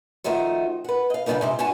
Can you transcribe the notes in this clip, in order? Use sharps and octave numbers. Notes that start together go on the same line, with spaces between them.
D#3 F3 A3 D#4 F#4
B4 F#5
D#5 F5
C#3 G3 G#3 B3 D4 D#4
G#2 C3 C5
G2 D4 F#4 G#5 A5